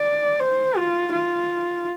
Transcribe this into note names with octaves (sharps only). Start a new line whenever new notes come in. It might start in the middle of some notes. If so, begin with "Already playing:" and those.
Already playing: D5
C5
F4
F4